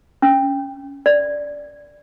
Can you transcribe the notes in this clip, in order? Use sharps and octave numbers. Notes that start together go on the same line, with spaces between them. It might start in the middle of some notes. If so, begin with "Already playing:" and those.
C#4
D5